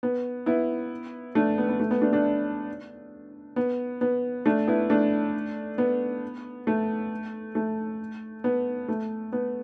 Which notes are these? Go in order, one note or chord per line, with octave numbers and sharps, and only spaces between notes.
B3
B3 E4
A3 D4
B3
B3
A3
B3
A3 D4
A3 D4
B3
B3
A3 D4
B3 E4
A3 D4
B3
A3
A3
B3
A3
B3